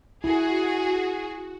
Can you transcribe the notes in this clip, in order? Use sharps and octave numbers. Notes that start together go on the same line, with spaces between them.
E4 F#4 G#4